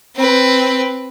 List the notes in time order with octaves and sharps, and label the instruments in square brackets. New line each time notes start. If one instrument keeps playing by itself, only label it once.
[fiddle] C4 B4